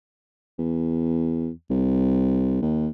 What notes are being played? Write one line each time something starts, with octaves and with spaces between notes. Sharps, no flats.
E2
C2
D#2